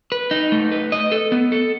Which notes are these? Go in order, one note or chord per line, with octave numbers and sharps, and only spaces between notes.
B4
D#4
A3
B4
D#5
A4
B3
A4